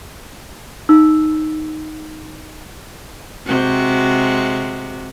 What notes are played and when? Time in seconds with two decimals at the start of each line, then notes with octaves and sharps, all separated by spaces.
0.89 D#4 E6
3.46 C3 G#3 F#4